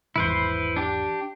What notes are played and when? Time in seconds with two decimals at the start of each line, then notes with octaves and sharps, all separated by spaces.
0.16 G#1 E2 E4 B4 C5
0.76 D4 G4